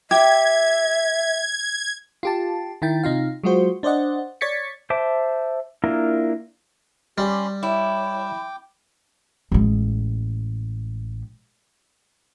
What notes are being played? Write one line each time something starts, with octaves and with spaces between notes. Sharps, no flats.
G4 E5 G#6
F4 G4 A5
D#3 E4 G5 A6
C3 D#4 F4 F5
F#3 G#3 F4 F#4 C5
D4 C5 D5 D#5 F#5
C#5 D5 G#6 A6 B6 C#7
C5 E5 A5 D6
A#3 D4 E4 F4 A#4
G3 C#4 G4 B5 C6
E4 C#5 G5 D6
A1 G#3